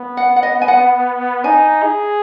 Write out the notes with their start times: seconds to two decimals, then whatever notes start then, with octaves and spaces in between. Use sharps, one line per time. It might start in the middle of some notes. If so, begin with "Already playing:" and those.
Already playing: B3
0.17 F#5
0.36 F#5
0.43 D#5
0.62 G#5
0.68 F#5
1.44 D#4 G#5
1.83 G#4